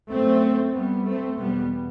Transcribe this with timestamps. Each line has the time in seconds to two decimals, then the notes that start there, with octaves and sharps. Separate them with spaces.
0.11 F#2 A3 C4
0.75 G3 B3
1.07 A3 C4
1.38 E2 B2 G3 B3